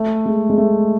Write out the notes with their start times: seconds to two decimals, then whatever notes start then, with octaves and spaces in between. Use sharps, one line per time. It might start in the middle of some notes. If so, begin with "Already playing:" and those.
Already playing: A3
0.25 G#3
0.50 G#3
0.58 A3